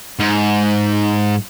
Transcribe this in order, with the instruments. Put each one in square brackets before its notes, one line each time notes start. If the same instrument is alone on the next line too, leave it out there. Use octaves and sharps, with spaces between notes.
[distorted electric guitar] G#2